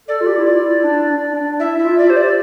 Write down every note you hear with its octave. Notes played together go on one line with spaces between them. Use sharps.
A4 D5
F4
G4
E4
F4 D5
E4
D4
D4
D4
E4 E5
E4 E5
F4
D5
G4 C5
D5